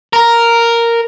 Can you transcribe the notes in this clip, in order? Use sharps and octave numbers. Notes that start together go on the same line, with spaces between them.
A#4